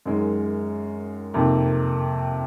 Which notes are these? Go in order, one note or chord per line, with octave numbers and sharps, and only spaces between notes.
F#2 D#3 G#3
F2 C3 D#3 A#3